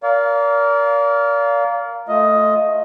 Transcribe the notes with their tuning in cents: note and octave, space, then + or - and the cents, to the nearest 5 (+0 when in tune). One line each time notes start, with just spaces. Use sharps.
A#4 +0 D5 -35 F5 +0
A3 +0 F4 +0 D#5 +10